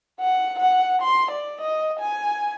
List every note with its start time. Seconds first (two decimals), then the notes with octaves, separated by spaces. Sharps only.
0.20 F#5
0.59 F#5
1.02 C6
1.31 D5
1.61 D#5
2.00 G#5